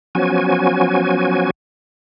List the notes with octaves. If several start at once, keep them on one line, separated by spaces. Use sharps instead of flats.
F3 F#3 B3 C#4 F#4 G#5